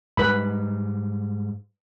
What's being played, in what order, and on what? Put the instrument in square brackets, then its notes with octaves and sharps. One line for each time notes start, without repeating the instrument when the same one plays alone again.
[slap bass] G#2 G3 [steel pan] B4 B5